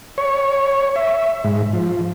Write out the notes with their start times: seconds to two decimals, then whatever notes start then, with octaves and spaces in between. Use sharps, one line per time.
0.18 C#5
0.96 E5
1.44 G#2
1.73 F3